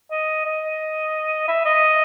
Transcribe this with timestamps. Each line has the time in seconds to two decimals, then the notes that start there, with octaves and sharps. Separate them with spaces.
0.11 D#5
0.46 D#5
1.48 E5
1.66 D#5